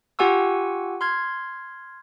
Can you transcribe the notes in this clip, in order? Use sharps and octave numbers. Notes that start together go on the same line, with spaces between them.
F4 G4 F#5 G#5 C#6 E6
C6 F6 G#6